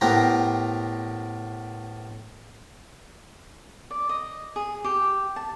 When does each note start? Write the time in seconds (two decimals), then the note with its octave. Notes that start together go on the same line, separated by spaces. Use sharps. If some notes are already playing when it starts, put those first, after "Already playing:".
0.01 A2 B3 G4 A#4 C5 A#5
3.90 D5
4.09 D#5
4.56 G#4
4.84 G4
5.36 A5